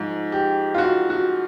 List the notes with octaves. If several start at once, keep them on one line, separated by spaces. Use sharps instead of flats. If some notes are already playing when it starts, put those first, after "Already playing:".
Already playing: G#2 F3
G4
F4
F#4
F#4